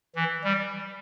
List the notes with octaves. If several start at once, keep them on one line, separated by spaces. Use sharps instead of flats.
E3
G3